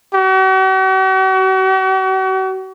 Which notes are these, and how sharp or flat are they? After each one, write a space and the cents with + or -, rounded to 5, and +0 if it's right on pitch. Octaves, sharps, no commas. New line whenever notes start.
F#4 +45